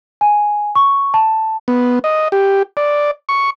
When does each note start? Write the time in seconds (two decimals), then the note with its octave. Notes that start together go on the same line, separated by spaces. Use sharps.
0.21 G#5
0.75 C#6
1.14 A5
1.68 B3
2.04 D#5
2.32 G4
2.77 D5
3.29 C#6